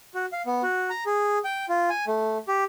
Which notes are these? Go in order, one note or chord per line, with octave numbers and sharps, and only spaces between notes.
F#4
F5
B3
F#4
A#5
G#4
G5
F4
G#5
A3
G4